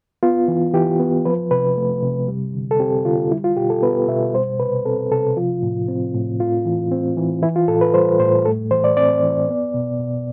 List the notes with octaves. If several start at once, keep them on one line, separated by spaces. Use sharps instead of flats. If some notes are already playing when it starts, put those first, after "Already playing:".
B3 F4
E3
E3 G4
B3
F3 B4
C3 B4
A3
C3
G3
D3
A4
C4 G4
D3 F4
G3 E4
F4
B2 G4
A4
B3 B4
B2 E5
G3 C5
C3 B4
C4 A4
C3 A4
F3 F4
A2
C4
A2
A3 F4
E3
C4
E3
E3 E4
F4
A2 A4
B4
G3 C5
A2 C5
A3 A4
E3 C5
D5
C4 D5
E3
B3
B2
B2